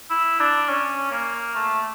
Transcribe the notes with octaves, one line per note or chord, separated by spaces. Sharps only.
E4
D4
C#4
A#3
A3